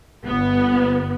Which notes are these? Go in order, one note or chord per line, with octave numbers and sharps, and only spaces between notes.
G1 B3